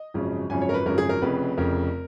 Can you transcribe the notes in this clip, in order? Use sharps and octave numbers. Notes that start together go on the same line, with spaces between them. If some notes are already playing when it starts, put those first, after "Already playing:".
Already playing: D#5
G#1 F#2 C#3 F3
G#1 F#2 C#3 F3 G#5
C#5
A#4
B4
G#1 F#2 C#3 F3 A#4
G#4
A#4
F1 F2 C#3 B4
F1 F2 C#3 A#4